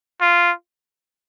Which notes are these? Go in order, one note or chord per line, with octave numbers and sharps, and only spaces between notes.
F4